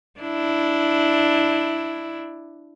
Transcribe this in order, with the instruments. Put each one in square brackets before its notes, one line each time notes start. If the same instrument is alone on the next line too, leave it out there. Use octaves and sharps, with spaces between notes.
[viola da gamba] D4 E4